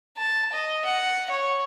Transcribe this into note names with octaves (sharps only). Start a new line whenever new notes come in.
A5
D#5
F#5
C#5